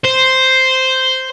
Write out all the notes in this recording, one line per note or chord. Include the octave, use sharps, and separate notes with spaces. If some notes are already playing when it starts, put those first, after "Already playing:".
C5